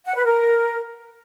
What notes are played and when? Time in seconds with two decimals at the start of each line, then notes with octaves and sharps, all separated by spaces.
0.06 F#5
0.16 B4
0.26 A#4